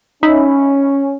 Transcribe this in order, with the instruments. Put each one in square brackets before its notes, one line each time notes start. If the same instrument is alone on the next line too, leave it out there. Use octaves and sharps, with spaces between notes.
[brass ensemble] C#4 [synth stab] D#4 E5 B5